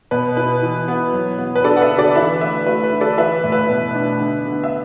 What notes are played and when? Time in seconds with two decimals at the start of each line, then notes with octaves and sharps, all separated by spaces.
0.11 B2 B4
0.37 E4 B4
0.62 E3
0.88 B3
1.13 F#3
1.39 B3
1.56 B4
1.64 D4 A4 D5
1.76 F#5
1.81 B4 E5
1.90 D3
1.98 A4 D5
2.15 E3 B4 E5
2.41 A3 B4 E5
2.67 A3 B4 E5
2.83 B4
2.92 D3
3.01 A4 D5
3.18 E3 B4 E5
3.44 A2
3.52 B4 E5
3.69 B2
3.95 D4
4.20 D3
4.46 D3
4.64 E5